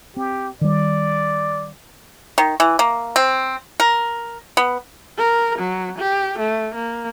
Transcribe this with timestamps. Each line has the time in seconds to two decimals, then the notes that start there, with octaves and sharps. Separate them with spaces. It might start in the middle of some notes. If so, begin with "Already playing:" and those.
0.17 C4 G4
0.61 D#3 G3 D5
2.38 D#3
2.60 E3
2.79 A#3
3.16 C4
3.80 A#4
4.57 B3
5.18 A#4
5.59 F#3
5.99 G4
6.39 A3
6.75 A#3